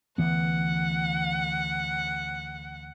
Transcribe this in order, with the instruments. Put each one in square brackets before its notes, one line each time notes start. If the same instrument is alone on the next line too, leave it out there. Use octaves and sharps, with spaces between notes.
[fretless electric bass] D2 E3 B3 [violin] F#5